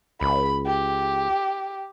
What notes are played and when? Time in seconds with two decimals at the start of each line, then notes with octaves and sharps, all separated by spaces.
0.21 C#2 B5
0.67 G4